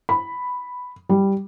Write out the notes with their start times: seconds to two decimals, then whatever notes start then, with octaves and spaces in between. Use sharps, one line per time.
0.09 B5
1.09 G3